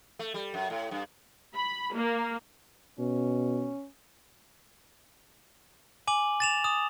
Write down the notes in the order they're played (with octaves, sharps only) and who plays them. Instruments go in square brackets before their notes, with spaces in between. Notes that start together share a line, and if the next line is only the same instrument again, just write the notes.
[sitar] A3
G3
F#2
A2
G2
[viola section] B5
A#3
[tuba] B2 [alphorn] C#4
[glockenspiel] G#5 D6 F#7
A6 E7 F7
D#6